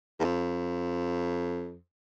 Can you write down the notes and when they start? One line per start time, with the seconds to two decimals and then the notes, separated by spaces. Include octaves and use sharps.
0.20 E2
0.24 F2